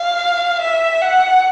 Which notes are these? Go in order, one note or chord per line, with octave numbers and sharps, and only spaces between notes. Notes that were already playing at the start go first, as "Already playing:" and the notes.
Already playing: F5
E5
F#5